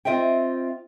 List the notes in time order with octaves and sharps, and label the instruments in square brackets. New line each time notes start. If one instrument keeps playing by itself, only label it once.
[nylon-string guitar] C4 F4 D#5 E5 G5